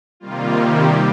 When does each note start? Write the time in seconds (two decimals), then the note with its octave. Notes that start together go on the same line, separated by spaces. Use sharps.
0.20 C3 D#3 G3 A#3 F4
0.61 G4